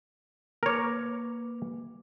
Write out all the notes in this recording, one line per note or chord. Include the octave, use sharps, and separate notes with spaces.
A#3 A#4 B4 C#5 D6